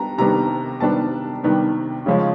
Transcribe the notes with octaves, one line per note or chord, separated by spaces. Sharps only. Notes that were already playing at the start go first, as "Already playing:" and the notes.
Already playing: G3 B3 D4 A#5
C3 D#3 G3 B3 D4 A#5
C3 D#3 G3 B3 D4 A5
C3 D#3 G3 B3 D4
C#3 F3 G#3 C#4